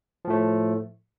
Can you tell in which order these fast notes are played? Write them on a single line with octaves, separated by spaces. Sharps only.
F3 A2 A3